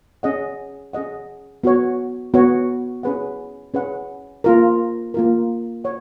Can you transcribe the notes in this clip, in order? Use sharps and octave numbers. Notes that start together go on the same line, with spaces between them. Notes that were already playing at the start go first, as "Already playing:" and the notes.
C#4 G#4 D#5 F#5
C#4 G#4 D#5 F#5
B3 F#4 C#5
B3 F#4 C#5
C#4 G#4 B4 F#5
C#4 G#4 B4 F#5
A#3 F4 A#4
A#3 F4 A#4
C#5 F#5